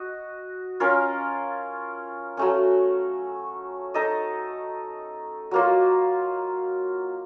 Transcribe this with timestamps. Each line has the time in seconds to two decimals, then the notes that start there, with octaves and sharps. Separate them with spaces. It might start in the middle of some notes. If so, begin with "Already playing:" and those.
Already playing: F#4 D#5
0.80 C#4 F4 A#4
2.37 F#3 A3 C#4
3.94 D#4 A4 D#5
5.51 F#3 A#3 F4